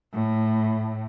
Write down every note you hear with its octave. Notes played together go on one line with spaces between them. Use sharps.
A2